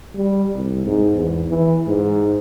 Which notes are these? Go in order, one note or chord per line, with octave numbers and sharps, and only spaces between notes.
G3
C2
G#2
E2
E3
G#2